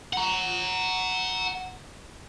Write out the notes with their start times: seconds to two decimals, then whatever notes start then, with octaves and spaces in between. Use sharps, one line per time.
0.13 F#5 A#5